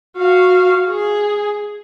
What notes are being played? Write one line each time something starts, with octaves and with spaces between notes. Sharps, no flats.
F#4 F5
G#4